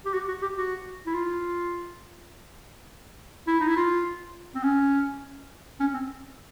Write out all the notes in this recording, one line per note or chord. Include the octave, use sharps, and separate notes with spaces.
G4
F#4
F#4
G4
F#4
E4
F4
E4
D#4
E4
F4
C4
C#4
C#4
C4